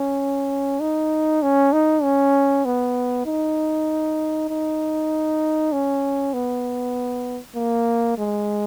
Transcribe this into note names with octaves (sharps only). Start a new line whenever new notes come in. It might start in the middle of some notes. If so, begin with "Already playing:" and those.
Already playing: C#4
D#4
C#4
D#4
C#4
B3
D#4
D#4
C#4
B3
A#3
G#3